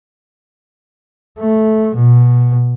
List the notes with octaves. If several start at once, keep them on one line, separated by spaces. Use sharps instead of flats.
A3
B2